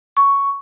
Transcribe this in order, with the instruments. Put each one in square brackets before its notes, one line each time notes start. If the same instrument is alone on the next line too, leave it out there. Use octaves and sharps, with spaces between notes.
[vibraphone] C#6